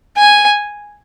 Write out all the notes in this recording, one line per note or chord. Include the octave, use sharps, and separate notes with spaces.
G#5